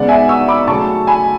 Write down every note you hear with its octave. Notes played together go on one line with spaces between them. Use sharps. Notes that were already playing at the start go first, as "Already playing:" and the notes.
Already playing: C#3 G#3 B3 D5 F#5
E5 G#5
C#6 E6
B5 D6
C#3 F#3 A3 A5 C#6
G#5 B5